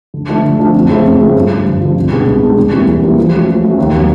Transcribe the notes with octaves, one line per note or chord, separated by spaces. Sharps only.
D3
F3 A3 D4
D3
F3 A3 D4
F2
C#3 F3 A3 C4
F2
C#3 F3 A3 C4
G2
D3 F3
G2
D3 F3
C2
B2 G#3 B3 D4
C2
B2 G#3 B3 D4
E2
C3 E3 G3 A#3
E2
C3 E3 G3 A#3
F3
A3 C#4 F#4
F3
A3 C#4 F#4
D#2
D#3 F#3 B3 D#4